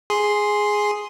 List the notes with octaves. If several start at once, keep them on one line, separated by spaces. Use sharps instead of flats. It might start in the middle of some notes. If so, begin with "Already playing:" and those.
G#4 C6